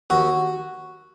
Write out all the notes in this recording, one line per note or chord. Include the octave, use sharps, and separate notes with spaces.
D#2 F#4